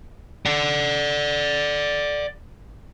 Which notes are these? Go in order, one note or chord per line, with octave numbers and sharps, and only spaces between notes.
D5 F#5